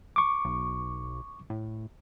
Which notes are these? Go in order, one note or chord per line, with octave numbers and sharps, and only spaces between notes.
C#6 D6
B1
A2